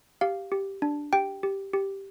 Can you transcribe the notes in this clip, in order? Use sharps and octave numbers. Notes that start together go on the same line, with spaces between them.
G4 F5
G4
D4
G4 G5
G4
G4